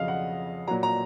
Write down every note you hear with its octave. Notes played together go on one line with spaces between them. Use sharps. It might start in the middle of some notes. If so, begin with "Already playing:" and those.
Already playing: F2 C#3 F#3 D#5 F5
F#5
A#2 F#3 A#5
A#5